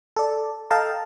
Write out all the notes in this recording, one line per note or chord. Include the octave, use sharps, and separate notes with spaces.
A4 D5
A4 D#5 F5 G5 A5 A#5